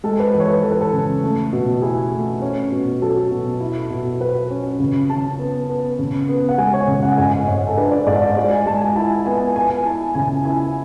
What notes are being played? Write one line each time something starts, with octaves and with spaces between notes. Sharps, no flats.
G#3 A4
B4
E3
C#5
B4
E3 A4
B4
A4
C#3
A3
B2
E4 G#4
A3
C#4
B2
F#3 A4
B2
E4
B2
F#3 B4
C#4
C#3
C#3 A5
B3
B3
C#3
B3
F#5
G#3 G#5
C#5
C#3
F#5
G#2 G#5
G#2 C#5
A4
D4 B4
D5
G#2 D5
D5
G#3 D5
G#5
G#3 A5
G#5
E4 A5
B3 G#5
B3 G#5
E4 A5
C#3 G#5
E4 G#5